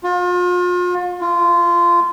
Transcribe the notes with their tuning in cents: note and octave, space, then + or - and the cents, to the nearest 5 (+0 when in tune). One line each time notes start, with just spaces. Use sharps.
F4 +35
F4 -20